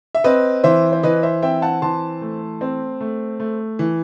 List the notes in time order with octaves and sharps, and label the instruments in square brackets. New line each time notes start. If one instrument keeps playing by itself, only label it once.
[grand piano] E5
C4 B4 D#5
E3 C5 E5
C5
E3 B4 D#5
C5 E5
C4 E5 G5
F#5 A5
E3 A5 C6
A3
C4
A3
A3
E3